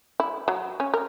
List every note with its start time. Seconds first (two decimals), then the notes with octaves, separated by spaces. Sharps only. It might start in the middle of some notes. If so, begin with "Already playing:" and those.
0.20 E4
0.48 F#3
0.80 C#4
0.94 A#4